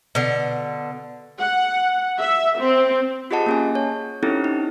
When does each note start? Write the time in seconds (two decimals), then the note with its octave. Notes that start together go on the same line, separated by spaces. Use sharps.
0.15 B2 D3
1.40 F#5
2.19 E5
2.59 C4
3.31 F4 G4 G#4 D#5 F#5 A5
3.46 A#3 C#4 G#5
3.75 C#5
4.23 C4 C#4 D#4 E4 G4 A4
4.44 D#4